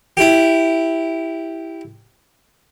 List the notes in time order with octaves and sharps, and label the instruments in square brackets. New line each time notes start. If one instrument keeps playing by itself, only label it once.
[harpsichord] E4 G4